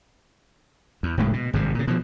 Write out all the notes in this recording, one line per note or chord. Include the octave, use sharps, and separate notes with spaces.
E2
F#1 D2 A2 G#3
B2
G#1 G2 C3
A#2 C#3
B2 F3